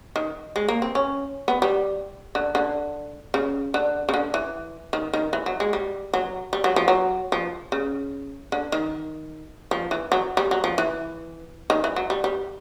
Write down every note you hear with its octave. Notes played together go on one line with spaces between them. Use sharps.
D#3
G#3
A#3
C4
C#4
B3
G3
D3
D3
C#3
D3
C#3
D3
E3
D#3
D#3
E3
F#3
G#3
G3
F#3
G3
F#3
F3
F#3
F3
C#3
D3
D#3
F3
E3
F#3
G3
F#3
F3
E3
D#3
E3
F#3
G3
G3